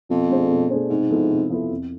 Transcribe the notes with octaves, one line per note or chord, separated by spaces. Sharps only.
F2 B2
A3 D4 G#4 C5
B2
A3 D4 G#4 C5
G#2 C3
F3 B3 E4 A4
C3
F3 B3 E4 A4
F2